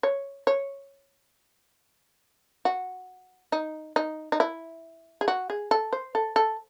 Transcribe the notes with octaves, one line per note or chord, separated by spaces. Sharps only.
C#5
C#5
F#4
D#4
D#4
D#4
E4
G#4
F#4
G#4
A4
C5
A4
A4